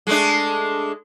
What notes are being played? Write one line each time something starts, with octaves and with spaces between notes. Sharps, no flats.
G#3 A3 D4